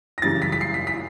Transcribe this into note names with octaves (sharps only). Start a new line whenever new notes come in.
A#6
F#2 C#3 E3 G3 A6
B6
B6
C7
B6
B6